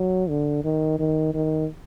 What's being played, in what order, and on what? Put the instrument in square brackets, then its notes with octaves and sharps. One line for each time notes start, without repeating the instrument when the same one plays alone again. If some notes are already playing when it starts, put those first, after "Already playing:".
Already playing: [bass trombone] F#3
D3
D#3
D#3
D#3